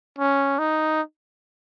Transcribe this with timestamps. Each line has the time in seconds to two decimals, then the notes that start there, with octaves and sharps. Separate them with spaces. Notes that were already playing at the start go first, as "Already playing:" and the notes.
0.19 C#4
0.59 D#4